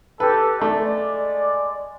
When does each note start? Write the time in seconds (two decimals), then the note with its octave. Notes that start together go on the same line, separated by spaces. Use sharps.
0.20 G4 A4 B4
0.61 G#3 A3 D5